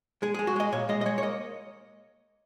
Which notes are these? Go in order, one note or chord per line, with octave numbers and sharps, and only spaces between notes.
G#3 G#4
G#4
G#3
F#4
G#3 D#5
A#2 C#5
G#3 D#5
D#5
G#3 C#5
C#5
A#3 D#5